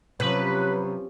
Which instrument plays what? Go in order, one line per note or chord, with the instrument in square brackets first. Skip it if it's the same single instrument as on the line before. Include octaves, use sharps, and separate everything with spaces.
[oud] C3 [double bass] F3 C#4 [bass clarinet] F#3 [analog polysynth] B4